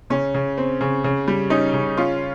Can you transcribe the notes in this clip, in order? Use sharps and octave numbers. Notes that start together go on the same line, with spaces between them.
C#3 C#4
C#3
C4
C#3
C#3
G3
C#4 D#4
C#3
C#4 F4